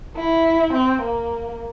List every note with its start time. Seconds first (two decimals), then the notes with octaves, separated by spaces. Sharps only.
0.16 E4
0.73 C4
1.02 A#3